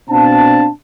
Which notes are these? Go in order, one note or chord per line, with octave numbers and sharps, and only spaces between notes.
B2 C4 D4 F5 A5